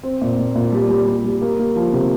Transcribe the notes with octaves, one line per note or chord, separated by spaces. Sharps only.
C4
A#2
A#2
A#2
G3
G3
G3
G3
A#3
A#3
F3
C3